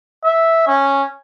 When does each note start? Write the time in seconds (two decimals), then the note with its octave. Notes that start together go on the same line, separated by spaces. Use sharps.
0.25 E5
0.67 C#4